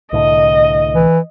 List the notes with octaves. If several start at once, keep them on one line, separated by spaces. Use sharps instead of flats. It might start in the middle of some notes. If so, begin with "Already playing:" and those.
C2 A2 D3 D#5
E3